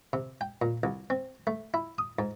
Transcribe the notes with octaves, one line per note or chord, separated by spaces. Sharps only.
C3
G5
A#2
C2
C4
A3
E4
D#6
G#2